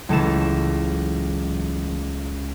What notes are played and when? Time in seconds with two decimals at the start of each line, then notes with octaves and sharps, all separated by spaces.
0.09 C#2 F#2 A2 E3 A4 E7